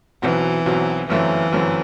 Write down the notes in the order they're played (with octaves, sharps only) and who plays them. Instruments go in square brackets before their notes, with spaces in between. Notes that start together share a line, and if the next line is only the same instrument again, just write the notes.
[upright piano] B1 B2 F#3 C4 [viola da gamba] E3
[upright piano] B1 B2 F#3 C4
[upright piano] G1 F#2 F#3 A3 C4 [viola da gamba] E3
[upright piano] G1 F#2 F#3 A3 C4